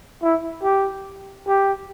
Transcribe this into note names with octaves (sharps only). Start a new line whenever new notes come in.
E4
G4
G4